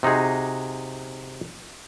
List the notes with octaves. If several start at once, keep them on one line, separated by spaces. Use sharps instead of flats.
C3 D#4 F#4 G#4